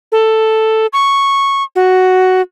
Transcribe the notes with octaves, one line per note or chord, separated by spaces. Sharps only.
A4
C#6
F#4